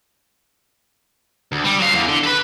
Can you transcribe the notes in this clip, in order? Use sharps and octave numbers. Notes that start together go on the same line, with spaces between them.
D2
G3
F#3 F5
E2
D3
A4 B4